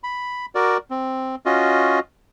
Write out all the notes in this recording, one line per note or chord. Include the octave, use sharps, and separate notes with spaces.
B5
F#4 A#4 D5
C4
C#4 F4 F#4 D#5